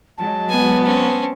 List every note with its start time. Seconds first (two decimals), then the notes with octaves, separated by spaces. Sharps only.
0.18 F#3 G#3 A5
0.49 B3 G#5
0.85 C4 C#4